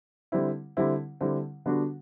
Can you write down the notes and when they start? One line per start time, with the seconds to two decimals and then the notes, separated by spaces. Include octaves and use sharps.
0.32 D3 G3 C4 E4
0.77 D3 G3 C4 E4
1.21 D3 G3 C4 E4
1.66 D3 G3 B3 D4 F#4